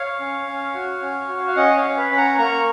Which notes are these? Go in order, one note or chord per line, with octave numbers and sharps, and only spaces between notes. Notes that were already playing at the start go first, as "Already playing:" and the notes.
Already playing: C#5 F5
C#4
C#4
F#4
C#4
F#4
F5
C#4 D#5 F#5
C#5 F5
C#4
B4
C#4 B5
F#5 A#5
A#3 A#5 C#6